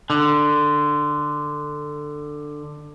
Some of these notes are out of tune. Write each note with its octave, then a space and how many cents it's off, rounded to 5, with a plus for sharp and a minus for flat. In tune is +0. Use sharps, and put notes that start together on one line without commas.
D3 +15